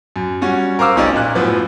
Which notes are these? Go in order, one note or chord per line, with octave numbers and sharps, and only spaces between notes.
F#2
G3 C#4 F#4
A#4 C5 F5 D6 E6
F1 B1 C#4 D#4 G4 D5
A#2 F#6
F#2 A2 F3 B3